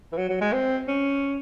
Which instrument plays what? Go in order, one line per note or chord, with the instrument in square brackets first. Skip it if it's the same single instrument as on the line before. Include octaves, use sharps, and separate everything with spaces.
[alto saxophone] E3
F#3
F#3
G#3
C4
C#4